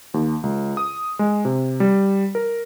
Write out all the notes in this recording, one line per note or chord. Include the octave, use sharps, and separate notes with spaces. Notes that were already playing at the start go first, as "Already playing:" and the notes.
D#2
C#2
D#6
G#3
C3
G3
A#4